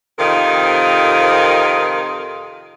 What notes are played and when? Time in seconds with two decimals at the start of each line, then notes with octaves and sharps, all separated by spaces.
0.19 F2 C3 D#3 G#4 A#4 F5